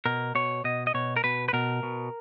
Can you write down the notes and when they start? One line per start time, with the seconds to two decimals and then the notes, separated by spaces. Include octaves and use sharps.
0.05 B2 A#4
0.35 B2 C#5
0.64 B2 D#5
0.87 D#5
0.94 B2 C#5
1.16 A#4
1.24 B2 B4
1.48 B4
1.53 B2 A#4
1.83 B2